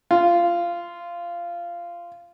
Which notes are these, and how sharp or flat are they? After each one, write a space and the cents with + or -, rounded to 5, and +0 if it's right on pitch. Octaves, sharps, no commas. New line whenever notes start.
F4 -15